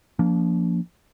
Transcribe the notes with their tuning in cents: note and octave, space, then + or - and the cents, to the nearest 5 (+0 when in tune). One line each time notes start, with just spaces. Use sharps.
F3 +0 A#3 +0 D4 -35